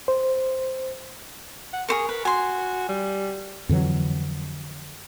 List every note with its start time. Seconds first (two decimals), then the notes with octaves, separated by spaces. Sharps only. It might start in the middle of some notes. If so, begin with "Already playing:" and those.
0.08 C5
1.73 F#5
1.88 G#4 A#4 C5 C#6
2.09 B4
2.25 F#4 G#5 C6
2.89 G3
3.69 F2 D3 E3 F#3